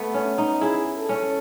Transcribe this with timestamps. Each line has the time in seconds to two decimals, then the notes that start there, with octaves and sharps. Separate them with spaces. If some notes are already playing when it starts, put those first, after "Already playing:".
Already playing: A3 B3
0.14 C#4
0.38 D#4
0.61 E4 G#4
0.97 A4
1.09 C#4